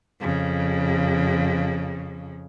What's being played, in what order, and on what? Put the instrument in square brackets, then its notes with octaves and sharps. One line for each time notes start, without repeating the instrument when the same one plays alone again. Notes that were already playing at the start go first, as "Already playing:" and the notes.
[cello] F2 C#3